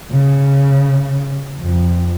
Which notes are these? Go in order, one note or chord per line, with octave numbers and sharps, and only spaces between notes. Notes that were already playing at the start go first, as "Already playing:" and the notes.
C#3
F2